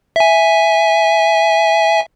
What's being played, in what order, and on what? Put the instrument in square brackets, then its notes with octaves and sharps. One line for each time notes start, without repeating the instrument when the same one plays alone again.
[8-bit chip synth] E5 G#5